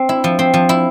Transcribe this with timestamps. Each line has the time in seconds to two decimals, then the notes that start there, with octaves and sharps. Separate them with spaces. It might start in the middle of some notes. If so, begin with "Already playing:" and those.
Already playing: C4
0.09 E4
0.24 F3
0.39 C4
0.54 F3
0.69 E4